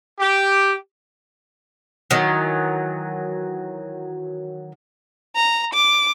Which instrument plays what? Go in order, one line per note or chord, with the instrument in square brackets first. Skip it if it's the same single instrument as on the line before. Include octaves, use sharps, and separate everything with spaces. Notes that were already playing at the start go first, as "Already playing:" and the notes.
[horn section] G4
[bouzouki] D#3 E3 F#3
[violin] A#5
D6